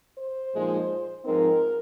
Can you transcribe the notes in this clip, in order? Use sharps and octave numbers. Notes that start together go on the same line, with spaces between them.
C5
A#2 F3 G#3 D#4
G#2 F3 G#3 C4 D#4 A#4